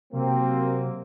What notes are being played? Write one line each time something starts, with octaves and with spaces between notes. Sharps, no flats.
C3 F#3 A#3 C4